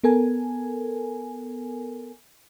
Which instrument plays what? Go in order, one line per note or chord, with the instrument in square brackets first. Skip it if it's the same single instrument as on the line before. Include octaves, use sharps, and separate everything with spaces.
[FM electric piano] B3 A4 A#4 G#5